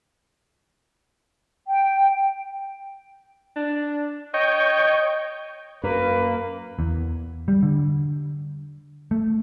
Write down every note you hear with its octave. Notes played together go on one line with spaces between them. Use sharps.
G5
D4
C#5 D#5 G5
F#2 A#3 B4
E2
G3
D3
A3